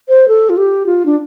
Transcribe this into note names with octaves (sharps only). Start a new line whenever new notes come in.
C5
A4
F4
G4
F4
D4